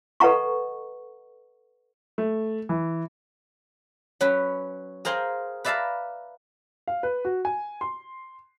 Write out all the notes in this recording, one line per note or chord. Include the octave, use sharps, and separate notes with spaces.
A4 B4 D#5 F#5 A#5 C#6
A3
E3
F#3 C#4 B4
G#4 A#4 C5 F5 G5 G#5
B4 D5 E5 F5 A5 A#5
F5
B4
F#4
G#5
C6